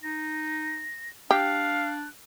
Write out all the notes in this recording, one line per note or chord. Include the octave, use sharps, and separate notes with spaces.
D#4 A#6
D4 G4 F5 F#6